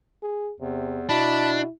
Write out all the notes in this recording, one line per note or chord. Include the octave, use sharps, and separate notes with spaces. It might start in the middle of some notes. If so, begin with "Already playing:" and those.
G#4
E2 C3
B2 D4 E4 A5 B5